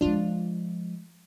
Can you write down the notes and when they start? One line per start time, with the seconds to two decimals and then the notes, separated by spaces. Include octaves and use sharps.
0.01 F3 G#3 D4 F4